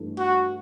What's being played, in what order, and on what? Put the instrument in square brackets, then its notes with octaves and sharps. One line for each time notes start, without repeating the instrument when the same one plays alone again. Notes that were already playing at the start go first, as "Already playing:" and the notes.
Already playing: [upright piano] G2 E3 A3
[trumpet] F#4